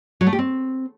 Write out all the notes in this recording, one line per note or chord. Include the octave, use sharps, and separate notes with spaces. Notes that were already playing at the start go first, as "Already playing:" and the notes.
F#3
A3
G4
C4